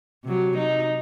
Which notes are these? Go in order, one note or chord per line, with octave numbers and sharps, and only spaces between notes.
C3 F#3
D#4